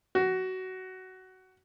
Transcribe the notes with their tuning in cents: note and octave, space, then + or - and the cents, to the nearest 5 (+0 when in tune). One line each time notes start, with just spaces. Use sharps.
F#4 +15